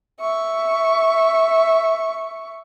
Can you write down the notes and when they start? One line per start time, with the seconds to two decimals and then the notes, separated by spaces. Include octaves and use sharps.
0.20 E5 C#6